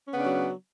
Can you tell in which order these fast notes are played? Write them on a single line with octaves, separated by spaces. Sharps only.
C#4 B3 C#3 D4 F#3